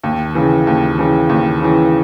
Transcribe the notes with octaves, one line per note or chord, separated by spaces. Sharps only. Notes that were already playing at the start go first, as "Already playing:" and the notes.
D#2
C#3 E3
D#2
C#3 E3
D#2
C#3 E3